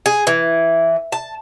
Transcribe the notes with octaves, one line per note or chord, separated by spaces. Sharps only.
G#4
E3
A5